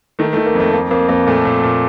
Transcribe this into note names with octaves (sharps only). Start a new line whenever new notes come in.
D#3 A3
A3
D#3
A#3
F2
A3
F2 A#3
F2 A#3
F2 A#3
A#2 A3
A#2
A#2